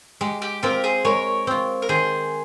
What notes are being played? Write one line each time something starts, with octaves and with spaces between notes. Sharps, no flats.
G#3 G4
G4
C4 F4 G4 A#4
G#4 C5
G#3 A#4 C#5
C4 F4
A#4
D#3 G#4 C5